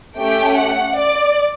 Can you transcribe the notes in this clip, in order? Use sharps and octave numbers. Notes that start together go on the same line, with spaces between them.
A3 C#4 G4 G5
F#5
D5